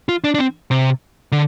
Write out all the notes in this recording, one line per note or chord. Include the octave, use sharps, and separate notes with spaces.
F4
D4
D4
C4
C3
D3